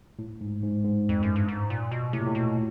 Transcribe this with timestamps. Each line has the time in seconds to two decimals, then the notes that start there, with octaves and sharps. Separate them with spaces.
0.19 A2
0.41 G#2
0.62 G#2
0.84 G#2
1.09 F2
1.23 F#2
1.36 G2
1.48 G#2
1.70 A#2
1.91 B2
2.13 A2 C3
2.20 A#2
2.27 A2
2.35 B2